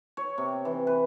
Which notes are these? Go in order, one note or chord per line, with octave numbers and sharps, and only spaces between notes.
C#5
C3
E3
B4